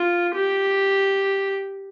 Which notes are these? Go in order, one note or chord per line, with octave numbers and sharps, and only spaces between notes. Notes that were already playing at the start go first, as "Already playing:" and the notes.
Already playing: F4
G4